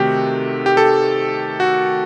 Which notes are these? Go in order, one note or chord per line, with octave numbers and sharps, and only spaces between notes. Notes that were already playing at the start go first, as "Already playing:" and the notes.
Already playing: C3 D#3 A3 C4 F#4 G4
G4
A4
F#4